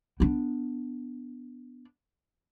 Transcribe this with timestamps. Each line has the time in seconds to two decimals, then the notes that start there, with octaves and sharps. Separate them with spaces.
0.20 B3 D4